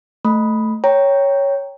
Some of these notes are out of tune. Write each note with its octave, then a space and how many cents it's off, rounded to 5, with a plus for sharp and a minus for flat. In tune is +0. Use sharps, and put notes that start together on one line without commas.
A3 +0 B5 +0
C#5 +0 G5 +0 A#5 +0